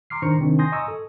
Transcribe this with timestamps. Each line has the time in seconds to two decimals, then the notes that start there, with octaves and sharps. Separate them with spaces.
0.10 A#5 C6 D6 F6 C7
0.22 D#3 D4 C5 A#5 C#6 C#7
0.39 C3 D#3 C4 D4 D#4
0.59 G#5 C6 D#6 G6 A#6
0.72 D#5 G#5 A#5 C#6 D#6 E6
0.88 A4